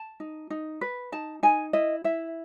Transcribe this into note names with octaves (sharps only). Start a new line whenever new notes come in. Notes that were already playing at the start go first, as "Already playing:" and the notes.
Already playing: A5
D#4
D#4
B4
D#4 A5
D#4 G#5
E4 D#5
E4 E5